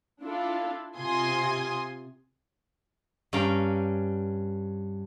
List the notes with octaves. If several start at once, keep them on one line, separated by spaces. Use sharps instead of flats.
D4 E4 F4 A4
C3 F4 G#5 C6 D#6
G2 C#4 F5 G5 A#5